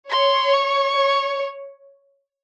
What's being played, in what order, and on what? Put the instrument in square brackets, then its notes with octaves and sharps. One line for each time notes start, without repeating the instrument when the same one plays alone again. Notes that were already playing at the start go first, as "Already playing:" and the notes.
[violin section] C#5 [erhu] C6
[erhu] C#6
[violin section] C#5